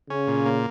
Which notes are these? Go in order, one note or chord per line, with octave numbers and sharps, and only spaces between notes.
C#3 C#4
A#2
A#3